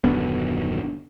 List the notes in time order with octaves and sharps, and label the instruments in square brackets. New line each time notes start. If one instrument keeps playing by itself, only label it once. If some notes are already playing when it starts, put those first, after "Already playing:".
[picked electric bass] D#1 F#2 D3 B3